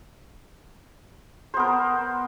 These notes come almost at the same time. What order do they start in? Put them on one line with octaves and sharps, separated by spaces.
C5 B3 A#4